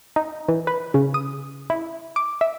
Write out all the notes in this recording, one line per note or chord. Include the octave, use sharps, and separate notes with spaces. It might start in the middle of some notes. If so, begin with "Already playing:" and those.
D#4
E3
B4
C#3
D#6
E4
D6
E5